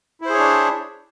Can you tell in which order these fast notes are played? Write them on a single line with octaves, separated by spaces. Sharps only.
E4 C5 G#4 C#5 D4